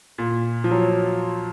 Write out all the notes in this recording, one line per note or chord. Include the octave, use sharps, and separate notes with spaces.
A#2
F3
F#3